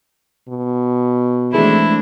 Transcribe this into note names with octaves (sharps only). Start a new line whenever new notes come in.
B2
D#3 E3 G#3 A3 C4 D4 E4